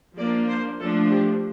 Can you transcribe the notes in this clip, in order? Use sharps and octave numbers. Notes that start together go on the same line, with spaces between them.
F3 A#3 D4 D5
C5
F3 A3 D4 A4
G4